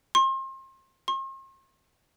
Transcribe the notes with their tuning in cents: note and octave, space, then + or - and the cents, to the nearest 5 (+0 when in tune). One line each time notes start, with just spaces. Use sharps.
C6 +35
C6 +45